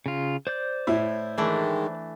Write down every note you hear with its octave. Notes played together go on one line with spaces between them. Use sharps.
C#3 F4
C5 D5 G6
A2 E4
D#3 E3 G#3 A3 D4